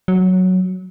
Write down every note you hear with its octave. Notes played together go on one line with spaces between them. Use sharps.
F#3